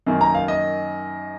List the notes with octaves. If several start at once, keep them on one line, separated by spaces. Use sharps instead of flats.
F#2 D#3 A#3
A#5
F5
D#5